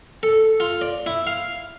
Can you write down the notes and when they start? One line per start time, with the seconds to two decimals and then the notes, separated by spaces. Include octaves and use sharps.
0.23 A4
0.60 F4
0.82 D5
1.06 E4
1.27 F5